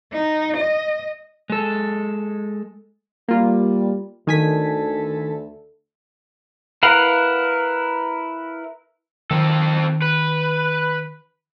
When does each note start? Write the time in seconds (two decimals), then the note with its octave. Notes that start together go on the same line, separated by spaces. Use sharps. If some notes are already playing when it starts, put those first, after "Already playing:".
0.12 D#4
0.57 D#5
1.50 G#3 A4
3.28 G3 A#3 F4
4.27 D2 D#3 A4 G#5 B6
6.83 E4 A#4 B4 F5 F#5
9.31 D#3 C4 A4
10.02 B4